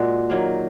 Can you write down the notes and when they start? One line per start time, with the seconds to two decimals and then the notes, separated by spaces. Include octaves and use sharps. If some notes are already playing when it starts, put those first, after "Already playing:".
Already playing: A#2 G#3 F#4
0.30 D#3 F#3 A#3